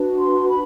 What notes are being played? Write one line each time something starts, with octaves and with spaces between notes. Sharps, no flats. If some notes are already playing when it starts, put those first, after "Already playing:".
Already playing: D4 F#4 B4
C6
B5